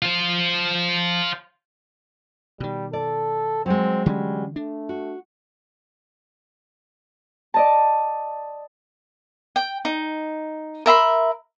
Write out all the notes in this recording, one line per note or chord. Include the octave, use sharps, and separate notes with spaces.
F4 C5
B2 D#3 G3
A4 D5
F#3 G#3 C4
D3 E3 G3 C#4
A3 D4
F#4
D5 D#5 A5
G5
D#4
A#4 E5 B5 C6